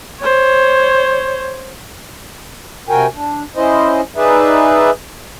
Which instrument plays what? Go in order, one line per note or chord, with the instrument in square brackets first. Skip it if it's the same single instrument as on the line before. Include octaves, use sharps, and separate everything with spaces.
[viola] C5 C#5
[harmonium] C3 F#4 A#4 G5 G#5
D4
C#4 E4 C5 D#5
D#4 G#4 B4 D5 E5